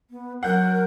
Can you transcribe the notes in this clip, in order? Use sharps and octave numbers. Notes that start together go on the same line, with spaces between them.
B3
F#3 A#4 F#5 F#6 G6